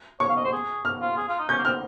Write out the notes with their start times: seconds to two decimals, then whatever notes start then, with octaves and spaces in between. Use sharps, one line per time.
0.20 C#5 C#6
0.29 F5
0.36 D#5
0.44 C5
0.52 G#4
0.85 F6
1.01 F4
1.17 G#4
1.28 F4
1.39 D#4
1.49 C#4 G6
1.58 A#3
1.65 C4 F6